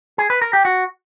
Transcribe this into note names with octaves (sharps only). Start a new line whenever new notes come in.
G#4
B4
A#4
G4
F#4